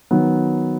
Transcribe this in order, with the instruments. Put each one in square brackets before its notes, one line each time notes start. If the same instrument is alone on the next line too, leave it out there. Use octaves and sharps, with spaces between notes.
[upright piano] D#3 F#3 B3